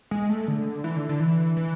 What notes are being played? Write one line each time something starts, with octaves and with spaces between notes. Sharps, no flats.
G#3
A3
D3
E3
D3
D3
E3
E3